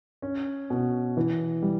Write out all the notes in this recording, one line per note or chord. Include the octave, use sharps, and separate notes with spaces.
C#4
B2
E3
G3